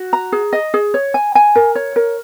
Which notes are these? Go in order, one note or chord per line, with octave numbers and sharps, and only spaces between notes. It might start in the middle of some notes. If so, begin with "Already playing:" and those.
Already playing: F#4
A#5
G#4
D#5
G#4
C#5
G#5
G#5
A#4
C#5
A#4